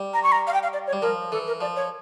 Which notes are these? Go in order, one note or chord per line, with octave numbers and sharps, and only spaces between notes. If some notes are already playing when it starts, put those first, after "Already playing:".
Already playing: G3
A#5
C#6
A#5
F5
G5
F5
D5
C#5
G3
F3 A#4
E3 A4
A#4
F3 D5
C#5